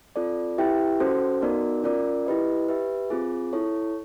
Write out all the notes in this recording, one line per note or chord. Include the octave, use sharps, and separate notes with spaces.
C4 F4 A4 D5
E4 G4 B4 E5 G5
C#4 F#4 A4 C5
B3 D#4 F#4 A#4 D5
C#4 F4 A#4 D5
E4 G4 B4 D#5
G4 B4 E5
C4 F4 G#4
E4 A4 C#5